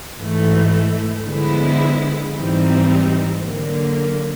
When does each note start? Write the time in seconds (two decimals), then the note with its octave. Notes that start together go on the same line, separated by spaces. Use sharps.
0.17 G#2 E3 A3
1.26 D3 F3 G#3 B3 E4
2.35 G#2 E3 G3 C4 D#4
3.44 D3 F#3 A#3